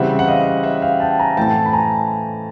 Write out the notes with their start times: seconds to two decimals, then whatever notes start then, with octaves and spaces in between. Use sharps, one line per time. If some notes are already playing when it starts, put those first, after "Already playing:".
Already playing: C#3 E3 G3 C4 E5 F#5
0.19 F#5
0.27 D#5 F5
0.63 E5 F#5
0.82 F5 G5
1.00 G5 A5
1.19 G#5 A#5
1.37 A2 E3 A3 C4 G5 A5
1.66 B5
1.73 G#5 A#5